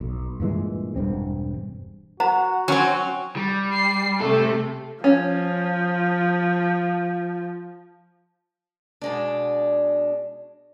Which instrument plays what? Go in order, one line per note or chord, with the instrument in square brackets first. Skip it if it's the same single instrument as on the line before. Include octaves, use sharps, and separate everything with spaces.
[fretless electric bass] B1
G2 A#2 E3 G#3
E1 G2 C4
[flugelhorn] F#4 [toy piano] C5 F#5 A#5
[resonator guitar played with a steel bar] F#3 C4 [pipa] C#4
[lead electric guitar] G3
[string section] C7
[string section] C3 A3 [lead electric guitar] A4
[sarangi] F3 [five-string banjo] C#4
[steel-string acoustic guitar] B2 G#3 D4